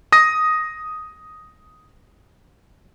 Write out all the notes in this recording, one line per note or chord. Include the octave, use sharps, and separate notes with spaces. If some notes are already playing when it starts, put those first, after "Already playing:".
D#6 A#6